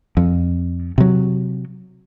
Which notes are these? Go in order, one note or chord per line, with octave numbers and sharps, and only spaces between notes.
F2
C3 F#3